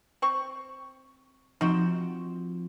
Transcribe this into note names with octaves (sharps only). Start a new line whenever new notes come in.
C4 C#6
F3 C4 D#4 F#4 E7